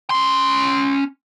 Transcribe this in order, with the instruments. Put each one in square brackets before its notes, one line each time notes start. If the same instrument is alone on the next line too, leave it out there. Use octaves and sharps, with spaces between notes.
[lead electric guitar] C#4 C6